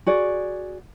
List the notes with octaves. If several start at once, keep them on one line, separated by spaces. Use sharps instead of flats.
F#4 G#4 D5